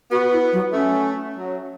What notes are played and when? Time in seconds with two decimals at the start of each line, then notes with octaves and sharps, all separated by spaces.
0.11 B3 F#4
0.32 E4
0.53 F#3
0.73 A3 C#4
1.36 F#3